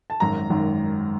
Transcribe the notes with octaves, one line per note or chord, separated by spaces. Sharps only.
A5
G#1 F#2 D#3 A#5
G#1 F#2 D#3